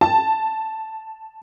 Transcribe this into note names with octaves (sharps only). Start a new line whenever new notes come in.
A5